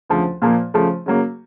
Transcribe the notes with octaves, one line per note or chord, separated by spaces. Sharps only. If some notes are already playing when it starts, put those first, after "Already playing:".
D2 C#3 F3
A#2 F3 A#3
C#3 F3 A3
C#3 F#3 A#3